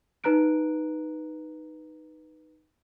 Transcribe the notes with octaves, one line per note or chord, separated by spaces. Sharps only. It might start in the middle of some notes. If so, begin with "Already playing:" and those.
D#4 B4 A#5 F#6 D7